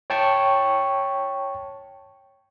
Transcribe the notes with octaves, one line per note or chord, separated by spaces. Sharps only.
C#5 G5 A5 C#6